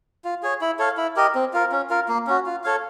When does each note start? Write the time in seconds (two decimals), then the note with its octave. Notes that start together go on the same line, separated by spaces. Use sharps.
0.24 F4
0.43 G#4 C#5
0.61 E4
0.79 A4 C#5 F5
0.97 E4
1.16 G4 A#4 D#5
1.35 C4
1.53 F4 A#4
1.72 C#4
1.90 F4 A#4
2.08 A#3
2.27 C#4 F#4
2.46 F4
2.64 A4 C#5 F5